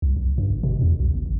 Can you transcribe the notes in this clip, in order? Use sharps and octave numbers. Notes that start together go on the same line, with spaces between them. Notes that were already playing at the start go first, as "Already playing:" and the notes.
C2
B1
G2
G1
B2
E2
B1
G1
A1